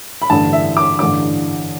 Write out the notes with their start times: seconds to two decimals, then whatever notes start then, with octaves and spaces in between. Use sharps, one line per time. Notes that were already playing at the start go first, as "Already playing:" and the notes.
0.22 B5
0.30 A1 G2 D3 A5
0.53 E5
0.77 D6
0.99 A1 G2 D3 D6